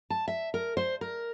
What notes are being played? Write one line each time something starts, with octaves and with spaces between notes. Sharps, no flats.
A5
E5
A#4
C5
A#4